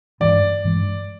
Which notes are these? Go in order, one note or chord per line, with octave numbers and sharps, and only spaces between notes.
G2 E3 G#3 D5
G2 E3 G#3